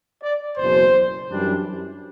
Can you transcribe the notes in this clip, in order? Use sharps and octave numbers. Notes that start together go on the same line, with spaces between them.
D5
F#1 E2 B2 F#3 C5
F#2 E3 G3 D4